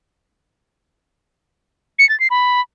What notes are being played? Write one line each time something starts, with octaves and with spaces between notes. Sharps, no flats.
C#7
A6
C7
B5